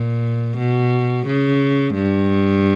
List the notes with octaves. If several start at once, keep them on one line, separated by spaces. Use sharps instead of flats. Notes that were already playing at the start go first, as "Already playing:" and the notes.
Already playing: A#2
B2
C#3
G2